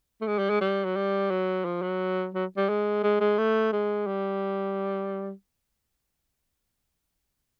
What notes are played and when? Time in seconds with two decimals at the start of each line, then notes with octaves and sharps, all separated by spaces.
0.21 A3
0.27 G#3
0.38 G3
0.49 G#3
0.61 G3
0.85 F#3
0.96 G3
1.30 F#3
1.65 F3
1.82 F#3
2.35 F#3
2.57 G3
2.69 G#3
3.03 G#3
3.21 G#3
3.38 A3
3.72 G#3
4.07 G3